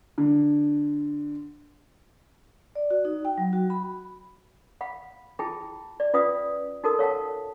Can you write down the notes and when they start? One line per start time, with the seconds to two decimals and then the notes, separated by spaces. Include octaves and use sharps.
0.18 D3
2.75 D5
2.91 F#4
3.05 D#4
3.25 G5
3.38 F#3
3.53 F#4
3.70 B5
4.81 F5 F#5 B5
5.39 E4 F4 G#4 G5 A5 B5
6.00 D5
6.14 C#4 F4 B4 D5 F5 D#6
6.84 D#4 F#4 A4 A#4 A5 D#6
6.99 C#5 F5 F#5 A5